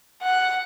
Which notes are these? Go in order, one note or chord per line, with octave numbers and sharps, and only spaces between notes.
F#5